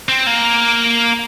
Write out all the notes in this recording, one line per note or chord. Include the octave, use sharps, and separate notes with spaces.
C4
A#3